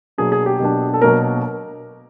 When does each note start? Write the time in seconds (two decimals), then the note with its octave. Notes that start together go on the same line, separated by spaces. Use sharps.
0.18 B2 F#3 A#3 D4 G#4
0.32 G#4
0.46 G4
0.60 B2 F#3 A#3 D4
0.94 A4
1.02 B2 F#3 A#3 D4 A#4